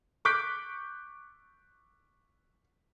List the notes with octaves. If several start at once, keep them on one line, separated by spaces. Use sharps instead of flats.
C#6 D6 F#6 G6 B6 D7